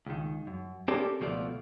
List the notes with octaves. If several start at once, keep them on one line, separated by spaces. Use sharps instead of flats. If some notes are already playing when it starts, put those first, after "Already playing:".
C#2 D#3
F#2
C4 C#4 G4 A4 A#4 D5
C#2 B2 F3 A3 D5